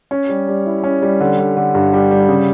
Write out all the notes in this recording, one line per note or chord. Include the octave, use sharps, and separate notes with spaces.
C#4
G3
G3
E4
C#4
G3
D3
D3
D3
G2
G3
G3
C#3